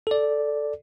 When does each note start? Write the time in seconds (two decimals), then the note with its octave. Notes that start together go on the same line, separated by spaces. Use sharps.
0.07 A4 D5